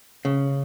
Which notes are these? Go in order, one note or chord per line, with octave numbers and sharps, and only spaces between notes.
C#3